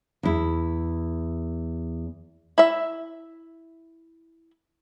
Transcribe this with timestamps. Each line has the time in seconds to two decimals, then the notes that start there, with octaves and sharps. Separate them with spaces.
0.23 E2 E4
2.58 E4 E5